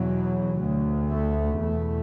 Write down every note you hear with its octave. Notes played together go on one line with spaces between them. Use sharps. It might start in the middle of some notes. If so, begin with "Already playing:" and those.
Already playing: E2 B2 F#3
D2
A3
E2 B2 A3